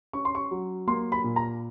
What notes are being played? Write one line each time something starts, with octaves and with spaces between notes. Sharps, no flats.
C#4 C#6
C6
C#6
F#3
A#3 C6
B5
A#2
A#5